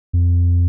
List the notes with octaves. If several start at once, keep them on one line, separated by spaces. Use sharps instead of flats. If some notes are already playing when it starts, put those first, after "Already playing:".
F2